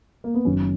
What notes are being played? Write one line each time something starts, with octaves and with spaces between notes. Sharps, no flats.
A#3
B3
F#1 F#2 D#3 F#3 C#4